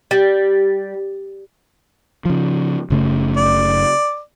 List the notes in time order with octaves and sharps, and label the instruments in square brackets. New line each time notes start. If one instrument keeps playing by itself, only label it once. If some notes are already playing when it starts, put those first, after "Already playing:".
[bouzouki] G3
[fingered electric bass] C#3 F3
F#1 C#3 A3
[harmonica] D5